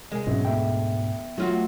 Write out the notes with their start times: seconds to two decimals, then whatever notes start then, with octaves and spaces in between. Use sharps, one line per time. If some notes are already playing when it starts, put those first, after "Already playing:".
0.12 C3 G#3 A#4 G#5
0.27 G#2 B2 F#3 C4 C#4 E4 D#5
0.45 D2 B3 E5 G5
1.38 F#3 A3 F4 F#4